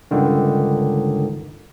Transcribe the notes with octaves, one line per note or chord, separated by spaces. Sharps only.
C#2 G2 D3 D#3